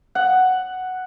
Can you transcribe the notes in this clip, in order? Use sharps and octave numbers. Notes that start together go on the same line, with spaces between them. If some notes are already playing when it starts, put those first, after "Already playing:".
F#5